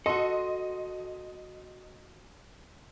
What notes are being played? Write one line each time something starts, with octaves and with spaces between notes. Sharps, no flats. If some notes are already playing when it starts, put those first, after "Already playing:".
F#4 A4 D#5 C6